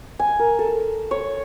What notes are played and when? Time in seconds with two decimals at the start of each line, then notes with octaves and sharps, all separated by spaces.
0.19 G#5
0.39 A#4
0.59 A4
1.11 C#5